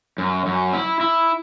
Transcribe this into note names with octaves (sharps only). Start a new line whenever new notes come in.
F#2
F#2
E4
E4